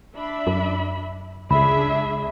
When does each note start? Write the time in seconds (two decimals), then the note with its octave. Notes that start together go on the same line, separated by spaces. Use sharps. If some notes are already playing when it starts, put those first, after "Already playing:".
0.14 D4 E5 B5
0.47 F#2
1.51 C#2 D4 G#4 E5 B5